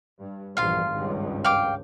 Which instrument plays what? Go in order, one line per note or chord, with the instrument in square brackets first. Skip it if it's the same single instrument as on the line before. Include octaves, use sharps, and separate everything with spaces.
[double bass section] G2
[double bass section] A#1 E2 G2 [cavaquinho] F4 F5
[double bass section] G#1 C#2 G2
[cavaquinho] F5 G5 D6